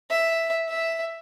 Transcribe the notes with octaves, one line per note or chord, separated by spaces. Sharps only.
E5
E5